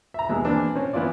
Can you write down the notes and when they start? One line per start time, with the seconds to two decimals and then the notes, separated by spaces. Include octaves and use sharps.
0.14 E5 A#5
0.29 D#2 B2 G#3 B3 E6
0.45 E3 A#3 C4 D4
0.76 C4 C#4
0.93 E3 B3 E4 F4 D5